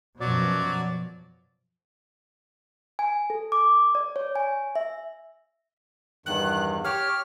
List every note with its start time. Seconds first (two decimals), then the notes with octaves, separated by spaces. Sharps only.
0.21 F#2 B2 F3 F#3 D5
2.99 G#5
3.30 A4
3.52 D6
3.95 D5
4.16 C#5
4.36 G#5
4.76 E5
6.26 E2 G2 D#3 F#6
6.84 G4 C#5 F6